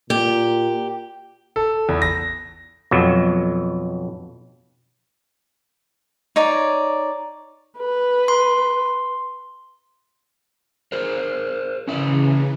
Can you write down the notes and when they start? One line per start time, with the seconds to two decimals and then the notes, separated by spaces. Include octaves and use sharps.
0.10 A#2 G4
1.56 A4
1.89 E2
2.02 A#6
2.91 F2 B2 F#3
6.36 D#4 C#5 D5
7.78 B4
8.28 C6
10.92 G#4 A#4 C5
11.87 C#3 E3 C#4 E4 E5